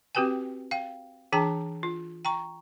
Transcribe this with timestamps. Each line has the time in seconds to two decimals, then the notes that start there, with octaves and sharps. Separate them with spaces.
0.15 C4 F#4 G4 B4 G5 G#5
0.71 F5 G5
1.32 E3 D4 G#4 G5 A5 A#5
1.83 F4
2.25 G5 A#5 C#6